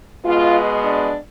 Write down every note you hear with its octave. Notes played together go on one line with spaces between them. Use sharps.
B2 G#3 B3 F4
D4